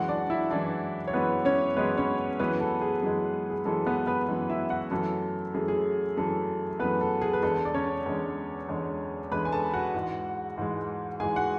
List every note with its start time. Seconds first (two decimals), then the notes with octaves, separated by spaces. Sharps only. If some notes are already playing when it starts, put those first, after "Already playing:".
Already playing: F#2 E3 G#3 F#4 F#5
0.09 D4 D5
0.30 E4 E5
0.50 F#2 E3 G#3 D4 D5
1.07 C#5
1.13 F#2 E3 G#3 B3 B4
1.45 C#4 C#5
1.76 F#2 E3 G#3 B3 B4
1.97 C#4 C#5
2.39 F#2 E3 G#3 B3 B4
2.60 A4
2.82 G#4
3.02 F#2 E3 G#3
3.50 G#4
3.65 F#2 E3 G#3 A4
3.86 B3 B4
4.07 B3 B4
4.28 F#2 E3 G#3
4.50 E4 E5
4.70 F#4 F#5
4.91 F#2 E3 A3 A4
5.54 F#2 E3 A3 G#4
5.68 G#4
6.17 F#2 E3 A3 A4
6.80 F#2 E3 A3 B3 B4
7.01 A4
7.21 G#4
7.33 B4
7.43 E2 D3 G#3 A4
7.65 D5
7.74 C#4 C#5
8.06 E2 D3 G#3
8.68 E2 D3 G#3
9.32 E2 D3 G#3 B4 B5
9.45 G#5
9.52 A4 A5
9.74 F#4 F#5
9.94 G#2 E3 G#3
10.58 G#2 E3 G#3
11.20 G#2 E3 G#3 G#4 G#5
11.36 F#4 F#5